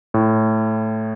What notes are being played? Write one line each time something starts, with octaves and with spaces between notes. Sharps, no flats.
A2